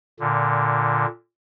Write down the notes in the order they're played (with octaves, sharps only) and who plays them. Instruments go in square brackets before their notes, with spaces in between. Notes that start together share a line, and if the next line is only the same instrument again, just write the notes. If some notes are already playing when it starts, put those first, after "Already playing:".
[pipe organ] A#2 D3